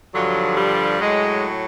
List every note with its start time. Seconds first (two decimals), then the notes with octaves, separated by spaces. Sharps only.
0.13 G2 D3 F3 F#3
0.57 G3
0.99 A2 F#3 G#3